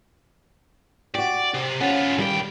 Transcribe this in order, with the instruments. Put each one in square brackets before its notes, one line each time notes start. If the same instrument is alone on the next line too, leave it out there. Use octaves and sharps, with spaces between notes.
[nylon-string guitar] F#4 G4 [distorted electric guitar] D5
[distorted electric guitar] C3
[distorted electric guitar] B3 F4 [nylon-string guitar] C#4 F#5
[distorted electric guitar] B1 G5 [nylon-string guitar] D#3 G3